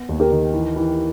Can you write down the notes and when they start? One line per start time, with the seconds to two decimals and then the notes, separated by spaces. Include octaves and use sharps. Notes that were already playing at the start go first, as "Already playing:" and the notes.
Already playing: B3
0.09 D#2
0.20 G4 A#4
0.31 D#3
0.53 E3
0.76 E3